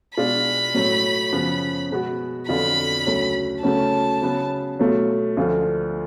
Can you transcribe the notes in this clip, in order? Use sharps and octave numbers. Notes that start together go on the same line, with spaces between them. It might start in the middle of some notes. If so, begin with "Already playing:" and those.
B2 G#3 D4 F4 B5
A2 F#3 A3
F#2 C#3 F3 B3
B2 G#3 B3 F#4
F2 D3 F#3 B3 F4 B5
D2 C#3 F#3
C#3 F#3 A3 C#4 F#4 A5
C#3 F#3 B3
B2 F#3 A3 F4
D2 D3 F3 A3 F4